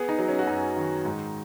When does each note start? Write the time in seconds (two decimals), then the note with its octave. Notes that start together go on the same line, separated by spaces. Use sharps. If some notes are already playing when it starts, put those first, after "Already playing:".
Already playing: B3 G#4
0.09 D#4
0.19 F#3
0.28 C#4
0.39 F#4
0.47 F#2 D#4
0.77 D#3
1.05 G#2